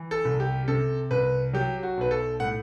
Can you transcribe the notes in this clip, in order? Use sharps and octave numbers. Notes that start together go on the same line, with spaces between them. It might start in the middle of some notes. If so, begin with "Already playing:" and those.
Already playing: E3
A4
C2
G4
C3 A4
C2 B4
F#3 G4
F#4
B1 B4
A4
A2 F#5